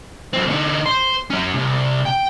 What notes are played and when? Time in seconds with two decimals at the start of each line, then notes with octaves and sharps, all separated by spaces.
0.33 F#3 C4
0.48 D3 D#4
0.86 C5
1.31 F#3 C#4
1.54 C2
2.05 G5